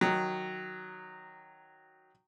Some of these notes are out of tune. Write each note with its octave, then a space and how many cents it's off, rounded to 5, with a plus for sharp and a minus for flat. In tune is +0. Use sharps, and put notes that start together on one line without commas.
D#3 +0 F#3 +0